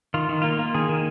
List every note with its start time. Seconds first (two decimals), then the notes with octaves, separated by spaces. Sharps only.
0.14 D#3 F4
0.29 D#3
0.42 A#3 F4
0.59 A#3
0.74 D#3 G#4
0.89 D#3